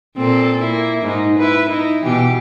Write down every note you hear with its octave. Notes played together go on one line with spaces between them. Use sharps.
A#2 C4 A4
A#3 E4
G#2 D#4
E4 B4
D#4 E4
B2 E3 G4